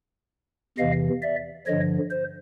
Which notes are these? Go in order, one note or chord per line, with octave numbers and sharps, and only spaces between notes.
E2 C3 E3 D#5 F5
D5 E5
G2 D3 F3 C#5 D#5
C5